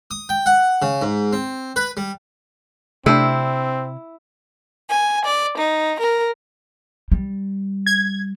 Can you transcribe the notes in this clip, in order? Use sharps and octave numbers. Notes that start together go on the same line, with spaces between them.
D#6
G5
F#5
C#3
G#2
C4
B4
G3
C3 A3 C4 D4 E4
G#5
D5
D#4
A#4
G3
G#6